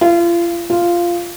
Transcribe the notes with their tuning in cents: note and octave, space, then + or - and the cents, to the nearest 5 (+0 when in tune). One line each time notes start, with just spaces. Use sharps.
F4 -35
F4 -10